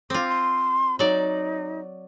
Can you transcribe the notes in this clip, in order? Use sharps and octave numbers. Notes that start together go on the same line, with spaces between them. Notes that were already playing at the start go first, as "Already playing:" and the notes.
C4 F4 D6
C6
F#3 D#4 D5